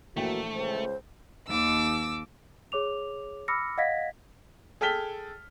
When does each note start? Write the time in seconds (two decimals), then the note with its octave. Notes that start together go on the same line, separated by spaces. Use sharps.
0.17 A#1 E3 A3 A#3 F#4 G5
0.55 C#2 C5
1.48 D#2 D6 E6
2.72 G#4 C#5 D6 F7
3.48 B5 D6 E6 F6 A#6 C#7
3.78 D#5 F5 F#5 G#6 A#6 B6
4.81 G#4 A4 G5 F6 B6 G7